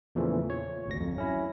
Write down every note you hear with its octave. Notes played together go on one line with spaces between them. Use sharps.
E2 A#2 C#3 E3 F3 A3
C#5
G#1 D2 A#6
F2
F#3 C#4 E4